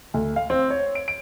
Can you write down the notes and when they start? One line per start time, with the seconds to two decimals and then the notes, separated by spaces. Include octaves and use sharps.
0.14 D2
0.36 F5
0.50 C4
0.70 C#5
0.95 D7
1.08 D7